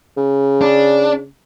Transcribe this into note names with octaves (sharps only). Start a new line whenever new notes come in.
C#3
D4